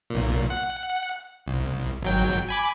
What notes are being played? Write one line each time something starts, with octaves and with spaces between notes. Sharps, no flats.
B1 A#2
F#5
C2
G#1 F#3 G5
G#5 B5 D6